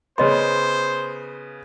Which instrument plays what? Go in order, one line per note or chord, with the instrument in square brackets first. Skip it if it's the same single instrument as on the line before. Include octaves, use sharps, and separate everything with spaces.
[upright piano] C#3 B3 [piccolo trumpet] C5 [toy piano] C#5 D#5 C6